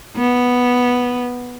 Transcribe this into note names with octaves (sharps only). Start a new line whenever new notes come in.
B3